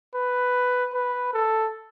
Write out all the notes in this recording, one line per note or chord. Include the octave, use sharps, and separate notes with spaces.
B4
B4
A4